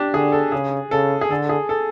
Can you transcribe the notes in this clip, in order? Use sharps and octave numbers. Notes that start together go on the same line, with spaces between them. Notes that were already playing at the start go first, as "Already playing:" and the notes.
Already playing: D4 G4
D3 G#4
A4
C#3 G#4
C#3 A4
G#4
D3 A4
G#4
A4